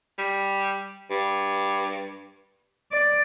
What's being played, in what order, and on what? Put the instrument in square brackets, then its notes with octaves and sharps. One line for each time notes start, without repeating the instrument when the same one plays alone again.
[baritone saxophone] G3
G2
[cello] D5